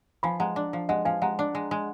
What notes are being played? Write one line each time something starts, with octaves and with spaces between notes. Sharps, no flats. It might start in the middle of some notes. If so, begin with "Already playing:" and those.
F3 G#5 B5
G#3 F#5 A#5
D4
F3
G#3 D#5 F#5
F3 F5 G#5
G#3 F#5 A#5
D4
G#3
G#3